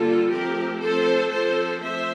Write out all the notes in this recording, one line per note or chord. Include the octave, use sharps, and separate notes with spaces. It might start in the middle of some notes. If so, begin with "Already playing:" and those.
Already playing: D3 G3 A#3 F4 A4
F3 A3 C4 G4 A#4
F3 A3 C4 A4 C5
F3 C4 A4 C5
F3 A3 C4 C5 E5